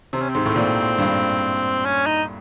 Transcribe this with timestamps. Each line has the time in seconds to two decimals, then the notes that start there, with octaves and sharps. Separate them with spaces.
0.13 C3 C4
0.21 C#4
0.29 C4
0.35 G#2
0.46 A2
0.56 A#2
0.98 G2
1.85 C#4
2.06 D#4